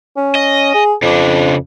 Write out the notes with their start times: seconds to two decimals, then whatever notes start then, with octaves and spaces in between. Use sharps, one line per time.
0.17 C#4
0.35 D#5
0.74 G#4
1.02 F2 C#3 D4